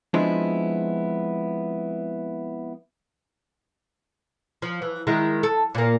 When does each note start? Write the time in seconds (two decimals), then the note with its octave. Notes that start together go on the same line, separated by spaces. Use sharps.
0.14 F3 G#3 B3 C4 D4 E4
4.62 F3
4.82 E3
5.07 D#3 G#3 E4
5.43 A4
5.75 A#2 A#3